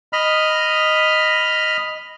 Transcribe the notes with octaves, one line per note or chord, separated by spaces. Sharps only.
D#5 B5 F6